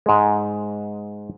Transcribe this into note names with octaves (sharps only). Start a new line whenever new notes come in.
G#2 G#3